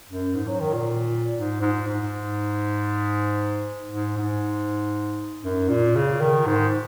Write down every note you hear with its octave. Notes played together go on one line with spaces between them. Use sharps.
F#2
G#2
F#3
D#3
A#2
G#2
G#2
G#2
G#2
G#2
F#2
A#2
C#3
D#3
G#2